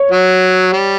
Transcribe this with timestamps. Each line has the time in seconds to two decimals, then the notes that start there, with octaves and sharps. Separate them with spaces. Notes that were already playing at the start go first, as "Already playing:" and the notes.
Already playing: C#5
0.11 F#3
0.73 G3